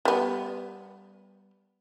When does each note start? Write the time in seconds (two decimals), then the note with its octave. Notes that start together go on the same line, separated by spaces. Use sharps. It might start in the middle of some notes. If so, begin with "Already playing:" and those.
0.05 G3 B3